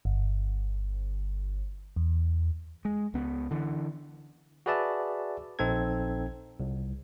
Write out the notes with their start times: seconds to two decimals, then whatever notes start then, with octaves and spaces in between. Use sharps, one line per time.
0.05 G1
1.96 E2
2.85 G#3
3.14 C#2 B3
3.51 D3 E3
4.66 F#4 G#4 B4 D5 E5 A5
5.59 A#1 C4 D#4 A4 G#6
6.60 C2